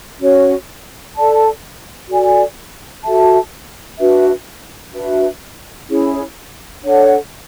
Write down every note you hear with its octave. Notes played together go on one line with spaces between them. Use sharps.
C#4 F#4 C#5
A4 D5 A5
F#4 A4 D5 G#5
F#4 A4 E5 A5
D4 F#4 B4 E5
D4 F#4 B4 E5
C#4 E4 G#4 C#5
D4 A4 C#5 F#5